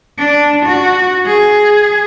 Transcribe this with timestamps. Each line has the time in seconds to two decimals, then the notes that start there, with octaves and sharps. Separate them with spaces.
0.18 D4
0.65 F#4
1.27 G#4